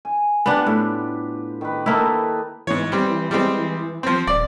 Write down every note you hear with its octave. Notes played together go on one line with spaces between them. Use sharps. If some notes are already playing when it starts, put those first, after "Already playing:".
G#5
B3 D4 F4 G4 B4
A2
D#3 B4
A#3 D#4 E4 A4 B4
G#2 E3 C#5
E3 G3 C4
E3 G3 G#3 C4
F3 C4
D#1 D5